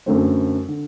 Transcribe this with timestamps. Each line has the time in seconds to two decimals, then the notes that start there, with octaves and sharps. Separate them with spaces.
0.06 F#2 D3 A3 C4
0.68 D3